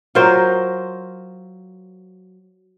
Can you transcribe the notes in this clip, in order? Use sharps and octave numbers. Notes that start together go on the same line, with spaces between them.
F#3 F4 A#4 C5